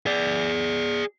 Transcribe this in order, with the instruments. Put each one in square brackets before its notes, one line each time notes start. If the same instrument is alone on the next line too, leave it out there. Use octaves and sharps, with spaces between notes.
[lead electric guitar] G#4 D5